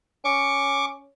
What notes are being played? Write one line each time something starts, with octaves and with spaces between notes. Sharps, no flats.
C#4 C#6 D6